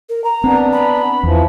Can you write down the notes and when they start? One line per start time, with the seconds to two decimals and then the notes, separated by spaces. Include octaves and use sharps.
0.09 A#4
0.24 A#5
0.44 B3 C4 D4
0.72 B5
1.23 E2 E3 F3